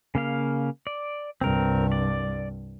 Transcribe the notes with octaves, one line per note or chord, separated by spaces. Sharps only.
C#3 A#3 F5
D5
C2 G2 C4 A#4
D5